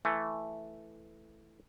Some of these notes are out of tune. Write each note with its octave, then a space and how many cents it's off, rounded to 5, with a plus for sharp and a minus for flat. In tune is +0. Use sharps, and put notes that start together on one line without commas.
E3 +5 A3 +0 G#5 +0